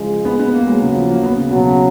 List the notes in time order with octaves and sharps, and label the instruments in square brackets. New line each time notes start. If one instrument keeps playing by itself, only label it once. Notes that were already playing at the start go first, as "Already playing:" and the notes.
Already playing: [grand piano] C#3 F3 [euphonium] G#3
[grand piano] B3
B3
A#3
[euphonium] F#3 [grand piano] G#3
[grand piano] C#3
F3
A#3
B3
C#3
[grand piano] B2 [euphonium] F#3
[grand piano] C#3